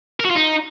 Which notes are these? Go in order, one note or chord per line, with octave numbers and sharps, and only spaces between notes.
A#4
F#4
F4
D#4